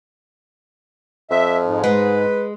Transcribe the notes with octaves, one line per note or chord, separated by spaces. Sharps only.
F2 E5
G#2
G#3 B4